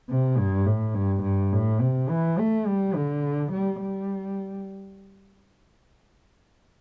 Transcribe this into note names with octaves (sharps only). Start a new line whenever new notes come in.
C3
G2
A2
G2
G2
A2
C3
E3
A3
G3
D3
G3
G3